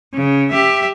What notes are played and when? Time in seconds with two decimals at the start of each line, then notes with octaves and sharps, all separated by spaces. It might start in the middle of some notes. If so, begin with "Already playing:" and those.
0.14 C#3
0.51 G4 E5